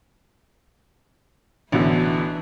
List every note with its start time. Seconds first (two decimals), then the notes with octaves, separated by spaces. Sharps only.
1.72 A1 B2 D3 E3 D4 E4